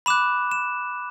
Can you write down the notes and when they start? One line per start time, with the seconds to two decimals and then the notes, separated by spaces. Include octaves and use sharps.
0.06 B5 D6 F#6 E7
0.51 E7